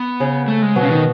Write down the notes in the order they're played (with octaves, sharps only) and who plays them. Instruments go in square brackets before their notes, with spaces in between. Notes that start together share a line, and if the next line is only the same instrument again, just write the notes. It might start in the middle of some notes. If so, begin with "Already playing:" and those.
Already playing: [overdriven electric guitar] B3
[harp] C#3
[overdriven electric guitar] A3
G#3
[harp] B2 [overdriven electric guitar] F#3
[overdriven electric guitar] C#3
D#3